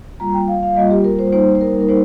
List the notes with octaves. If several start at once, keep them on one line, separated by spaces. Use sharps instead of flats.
G3 A#3 F4 A#5
G5
F5
F5
G3 A#3 F4 D#5
G4
A#4
C5
G3 A#3 D#4 C5
C5
A#4
A#4
G3 A#3 D#4 C5